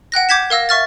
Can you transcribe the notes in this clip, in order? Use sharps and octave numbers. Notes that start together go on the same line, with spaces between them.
F#5 G5 F#6 A#6
D6 G6 G#6 B6 E7
A#4 F5 E6 A#6
E5 C#6 F6 A6